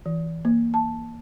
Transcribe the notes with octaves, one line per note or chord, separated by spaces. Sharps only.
E3
A#3
A5